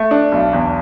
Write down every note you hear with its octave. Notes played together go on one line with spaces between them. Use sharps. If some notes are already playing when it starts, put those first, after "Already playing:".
Already playing: A3
D4
B1
E2